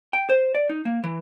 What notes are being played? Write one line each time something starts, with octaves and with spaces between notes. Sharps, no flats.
G5
C5
D5
D#4
A#3
E3